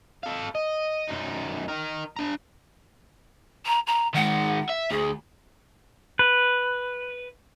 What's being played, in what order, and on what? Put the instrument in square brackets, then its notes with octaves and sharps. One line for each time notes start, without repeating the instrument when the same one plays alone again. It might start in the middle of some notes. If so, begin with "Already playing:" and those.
[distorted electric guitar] A4 F5
D#5
F#2 D#4
D#4 A#4
D4 A#5
[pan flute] A#5
A#5
[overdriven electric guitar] D#3 G#3 [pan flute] F#5
[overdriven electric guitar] E5
[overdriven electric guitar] D2 [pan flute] G#4
[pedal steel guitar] B4